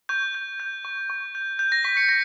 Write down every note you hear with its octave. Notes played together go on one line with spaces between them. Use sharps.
C#6 G6
G6
G6
C#6
C#6
G6
G6
A#6
C#6 B6
C#7
A#6